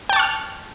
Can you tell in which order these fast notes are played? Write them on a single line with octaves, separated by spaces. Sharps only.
G5 A5 C#6 F6